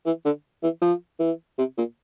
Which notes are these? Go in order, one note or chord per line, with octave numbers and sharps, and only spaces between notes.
E3
D3
E3
F3
E3
C3
A#2